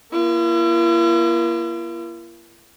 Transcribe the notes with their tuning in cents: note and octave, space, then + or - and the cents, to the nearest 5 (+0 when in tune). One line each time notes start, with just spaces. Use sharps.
A#3 +30 E4 +45